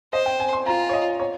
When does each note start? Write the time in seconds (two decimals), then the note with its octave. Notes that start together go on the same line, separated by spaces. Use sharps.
0.13 C5 D#5
0.26 G5
0.40 G#5
0.53 C6
0.66 F4 A#5
0.89 C#5
0.93 D#5
1.20 C#5